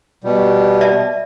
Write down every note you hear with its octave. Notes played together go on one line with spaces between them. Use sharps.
B2 G3
D5 E5 A5